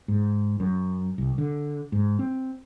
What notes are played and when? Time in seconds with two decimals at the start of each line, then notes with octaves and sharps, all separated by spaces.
0.08 G#2
0.60 F#2
1.18 C2
1.38 D3
1.92 G#2
2.19 C4